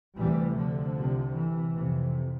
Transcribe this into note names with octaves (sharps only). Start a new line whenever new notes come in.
D2 C3 E3 G3
D3 F3
C2 C3
E3
F2 C3